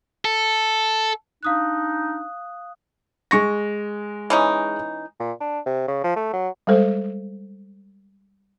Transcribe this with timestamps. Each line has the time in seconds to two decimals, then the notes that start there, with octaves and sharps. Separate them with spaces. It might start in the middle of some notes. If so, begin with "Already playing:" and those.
0.25 A4
1.43 D4 D#4 F5 D#6 F#6
3.31 G#3 C#6 A#6
4.30 E3 C#4 D#4
5.20 A#2
5.41 D4
5.66 C3
5.88 C#3
6.04 F3
6.16 A3
6.33 F#3
6.67 G3 G#3 A4 C5